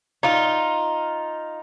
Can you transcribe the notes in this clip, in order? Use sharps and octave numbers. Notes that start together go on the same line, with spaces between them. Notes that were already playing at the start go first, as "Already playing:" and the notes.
D#4 F4